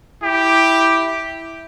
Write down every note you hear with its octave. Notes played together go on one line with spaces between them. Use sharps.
E4 G4